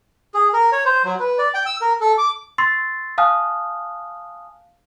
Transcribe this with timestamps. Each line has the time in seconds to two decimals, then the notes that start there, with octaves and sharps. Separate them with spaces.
0.34 G#4
0.53 A#4
0.72 C#5
0.85 C5
1.04 F#3
1.20 B4
1.38 D5
1.54 G5
1.66 E6
1.81 A#4
2.01 A4
2.18 D6
2.58 C6 C#6 E6 A6 C7
3.18 F5 G#5 A5 D#6 F6 F#6